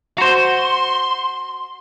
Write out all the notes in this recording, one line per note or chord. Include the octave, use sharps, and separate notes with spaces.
F#4 C5 A#5 C6